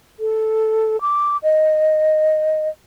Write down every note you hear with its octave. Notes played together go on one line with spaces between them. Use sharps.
A4
D6
D#5